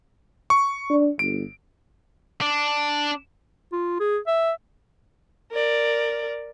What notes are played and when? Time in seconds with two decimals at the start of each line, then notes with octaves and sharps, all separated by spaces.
0.50 C#6
0.90 D4
1.19 G1 D7
2.41 D4
3.72 F4
4.00 G#4
4.27 E5
5.51 A#4 D5